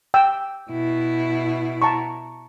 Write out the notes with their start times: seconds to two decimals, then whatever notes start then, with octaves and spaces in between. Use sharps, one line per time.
0.14 G5 E6
0.71 B2 E4
1.82 A5 A#5 C#6